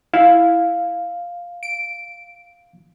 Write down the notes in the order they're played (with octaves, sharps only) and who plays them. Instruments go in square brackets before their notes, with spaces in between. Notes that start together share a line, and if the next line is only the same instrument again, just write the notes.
[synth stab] E4 [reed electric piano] F5
[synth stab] D7